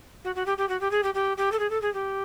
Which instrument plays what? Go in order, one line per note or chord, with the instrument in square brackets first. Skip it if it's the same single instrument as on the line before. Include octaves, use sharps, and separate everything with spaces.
[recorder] F#4
F#4
G4
G4
F#4
G4
G#4
G4
G4
G4
A4
G#4
A4
G#4
G4